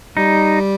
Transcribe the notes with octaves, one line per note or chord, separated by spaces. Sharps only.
G3 D#4